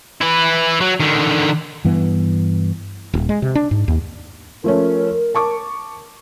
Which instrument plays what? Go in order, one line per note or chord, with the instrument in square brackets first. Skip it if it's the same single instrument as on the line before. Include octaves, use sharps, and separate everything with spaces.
[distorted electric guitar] E4 B4
F#3
D3 D#3
[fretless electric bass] G2 E3 B3
D#1
G#3
C3
D4
G#2
D#2
[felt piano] F3 A3 C#4 [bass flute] A#4
[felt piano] A5 C#6 D6